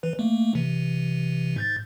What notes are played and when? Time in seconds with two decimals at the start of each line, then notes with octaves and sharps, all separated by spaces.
0.03 E3 B4
0.19 A3 A#3
0.55 C3 E3
1.56 G#2 G6 A6